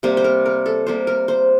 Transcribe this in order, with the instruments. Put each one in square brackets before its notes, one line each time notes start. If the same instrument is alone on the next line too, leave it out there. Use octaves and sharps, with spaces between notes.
[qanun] C3 G3 A#3 C5
C5
A#4
A#4
A4
C3 G3 A#3 C5
A#4
C5